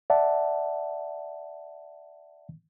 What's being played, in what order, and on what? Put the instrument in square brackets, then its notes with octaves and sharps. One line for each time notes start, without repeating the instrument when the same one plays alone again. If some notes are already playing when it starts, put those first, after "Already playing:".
[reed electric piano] D5 E5 F#5 A5